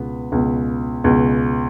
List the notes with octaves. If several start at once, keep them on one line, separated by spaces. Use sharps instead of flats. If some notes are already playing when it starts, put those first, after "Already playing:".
Already playing: C#2 B2 B3
C#2 B2
C#2 B2